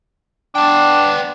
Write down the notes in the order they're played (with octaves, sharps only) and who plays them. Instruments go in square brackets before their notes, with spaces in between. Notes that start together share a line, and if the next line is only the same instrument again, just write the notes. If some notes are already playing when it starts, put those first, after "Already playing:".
[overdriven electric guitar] B3 G5 [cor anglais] D4